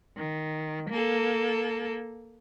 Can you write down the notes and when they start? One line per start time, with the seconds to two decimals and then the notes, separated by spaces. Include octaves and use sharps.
0.17 D#3
0.89 A#3 A4